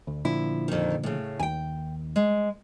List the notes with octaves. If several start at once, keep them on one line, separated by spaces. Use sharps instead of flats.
D2
A#2 D3 F3 E4
F2 D#3
A2 C#3
D#2 G5 G#5
G#3